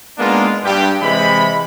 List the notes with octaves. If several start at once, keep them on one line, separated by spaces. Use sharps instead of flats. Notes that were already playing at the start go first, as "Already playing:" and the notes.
G#3 A#3 B3 D4 D#4 F4
G2 G4
C3 E3 G#3 B5